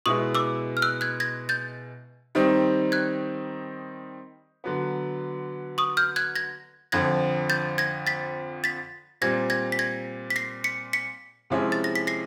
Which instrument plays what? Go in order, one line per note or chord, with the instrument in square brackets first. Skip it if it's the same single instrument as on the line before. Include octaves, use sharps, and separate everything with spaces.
[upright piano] B2 G#3 B3 E4 [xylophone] C#6 D#6
[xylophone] D6 E6
F6
E6 F#6
F#6 G#6
G#6 A#6
G6 A6
[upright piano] D#3 G3 C4 D#4
[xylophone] F#6 G#6
[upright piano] D3 F#3 B3
[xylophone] C#6 D#6
F6 G6
F#6 G#6
G#6 A#6
[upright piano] F2 D3 F3 [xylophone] G#6 A#6
[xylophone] G6 A6
G#6 A#6
A6 B6
A6 B6
[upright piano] A#2 G3 C4 [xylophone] G#6 A#6
[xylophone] G#6 A#6
B6
G#6 A#6
B6
A#6 C7
B6 C#7
B6 C#7
[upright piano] C3 F3 G#3 C#4 E4
[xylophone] A6
A#6
B6
A#6 C7